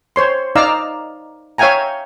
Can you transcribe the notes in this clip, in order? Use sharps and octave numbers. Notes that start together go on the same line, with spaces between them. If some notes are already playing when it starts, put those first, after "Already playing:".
C5 C#5 C6
D#4 D5 F5 A#5 E6
C#5 E5 F5 G5 G#5 A#5